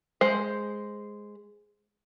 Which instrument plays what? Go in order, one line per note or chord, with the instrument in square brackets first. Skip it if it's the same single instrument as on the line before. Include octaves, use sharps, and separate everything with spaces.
[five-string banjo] G#3 C5